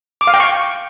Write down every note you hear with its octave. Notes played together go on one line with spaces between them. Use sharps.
D6
F5
G5
C#6